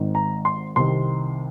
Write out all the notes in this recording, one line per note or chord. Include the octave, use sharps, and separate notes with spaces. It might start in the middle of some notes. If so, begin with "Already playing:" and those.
Already playing: G#1 G#2 D#3
A#5
C6
C2 C3 D#3 C6